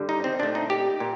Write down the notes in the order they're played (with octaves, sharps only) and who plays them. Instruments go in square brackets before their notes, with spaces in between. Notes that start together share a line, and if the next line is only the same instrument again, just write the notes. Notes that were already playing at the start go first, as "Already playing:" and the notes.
Already playing: [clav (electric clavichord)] G2 D3 G3
D#4
C4
A#2 A3 D4
D#4
G4
A#2